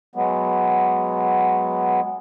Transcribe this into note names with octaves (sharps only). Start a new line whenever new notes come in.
F#3 G#3 B3